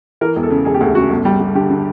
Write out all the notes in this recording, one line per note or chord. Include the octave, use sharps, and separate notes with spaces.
E3 A#4
E1
A4
C#3
E1 G#4
G4
D2 G#4
C#3 F#4
G1
G3
G3
D3 G4
D3